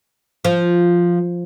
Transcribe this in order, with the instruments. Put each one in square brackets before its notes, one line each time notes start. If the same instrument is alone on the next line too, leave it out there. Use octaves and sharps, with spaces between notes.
[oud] F3